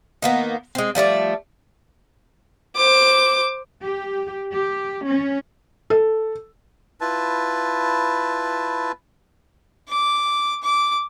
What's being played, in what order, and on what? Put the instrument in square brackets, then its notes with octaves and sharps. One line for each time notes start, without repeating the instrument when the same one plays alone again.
[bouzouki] D#3 A#3 B3
G#3 C4
F3 G3 A3 D5
[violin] C5 D6
[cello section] G4
G4
C#4
[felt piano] A4
[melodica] E4 F4 B4 A5
[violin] D6
D6